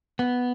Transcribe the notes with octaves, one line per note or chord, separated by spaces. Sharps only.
B3